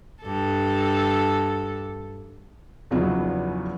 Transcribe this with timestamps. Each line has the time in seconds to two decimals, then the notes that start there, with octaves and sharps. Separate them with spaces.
0.22 G2 A4
2.91 E2 C#3 F3 F#3 B3 D#4